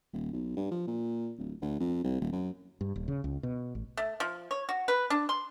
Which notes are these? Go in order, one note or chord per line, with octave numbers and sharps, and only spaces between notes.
D#1
B1
G2
F3
A#2
D1
D2
F2
C2
D#1
F#2
G2
D#1
C#3
C#2
B2
A1
A3
F3
C#5
F#4
B4
D4
C6